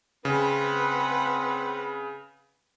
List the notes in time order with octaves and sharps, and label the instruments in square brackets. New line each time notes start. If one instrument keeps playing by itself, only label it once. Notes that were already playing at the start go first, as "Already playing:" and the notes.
[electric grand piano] C#3 [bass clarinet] C4 [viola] B4 F#5